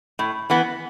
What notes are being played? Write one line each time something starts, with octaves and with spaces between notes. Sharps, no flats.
A2
E3 B3